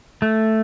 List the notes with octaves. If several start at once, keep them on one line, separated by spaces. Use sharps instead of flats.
A3